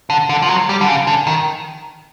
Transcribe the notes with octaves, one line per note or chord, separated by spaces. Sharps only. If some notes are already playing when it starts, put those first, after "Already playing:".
D3
D3
F3
F#3
G3
D3
C#3
D3
D#3